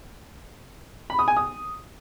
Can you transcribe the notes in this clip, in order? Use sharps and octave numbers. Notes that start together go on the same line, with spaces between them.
B5
D#6
G#5
D#6